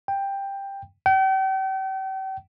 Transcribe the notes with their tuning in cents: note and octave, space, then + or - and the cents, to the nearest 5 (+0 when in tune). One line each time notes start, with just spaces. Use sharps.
G5 +10
G5 -40